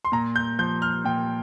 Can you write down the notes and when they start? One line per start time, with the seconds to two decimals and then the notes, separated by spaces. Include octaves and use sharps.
0.05 C6
0.12 A#2 A#5
0.36 G6
0.59 F3 G6
0.82 F6
1.05 A#2 G5